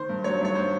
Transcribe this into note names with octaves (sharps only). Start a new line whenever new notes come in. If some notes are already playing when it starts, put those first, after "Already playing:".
Already playing: D#3 C5
G2
F#3 C#5
G2 C#5
C5